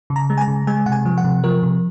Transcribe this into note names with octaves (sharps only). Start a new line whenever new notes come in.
C#3
A#5
G#3
G#5
A#5
C#3
G#3 G#5
C3 F#5
G#5
F3
F#5
C3
F3 A#4
C3